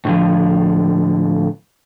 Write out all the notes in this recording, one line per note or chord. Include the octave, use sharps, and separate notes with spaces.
A2 D3 F3